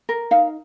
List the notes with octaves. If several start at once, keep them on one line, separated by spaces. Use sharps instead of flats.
A#4
D#4 F5